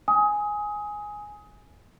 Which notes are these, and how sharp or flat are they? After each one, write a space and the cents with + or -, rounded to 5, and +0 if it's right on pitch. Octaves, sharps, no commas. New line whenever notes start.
G#5 +0 D#6 +20